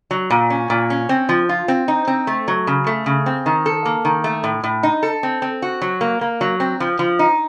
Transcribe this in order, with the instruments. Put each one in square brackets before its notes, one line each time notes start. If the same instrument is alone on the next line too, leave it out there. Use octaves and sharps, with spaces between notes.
[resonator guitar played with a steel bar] F#3
A#2
C#4
A#2
C#4
C4
F3
F4
C4
D#4
C4
A3
F#3
C#3
A3
C#3
C4
D#3
A4
A#3
D#3
A3
A2
A2
D#4
A4
C4
C4
F#4
F#3
A#3
A#3
F#3
C4
F3
F3
D#4